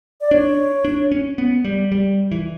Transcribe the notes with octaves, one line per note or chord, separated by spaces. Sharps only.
D5
D4 C#5
D4
C#4
B3
G3
G3
E3